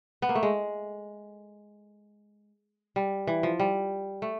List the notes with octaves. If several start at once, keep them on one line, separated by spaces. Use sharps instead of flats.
B3
A#3
A3
G#3
G3
E3
F3
G3
A3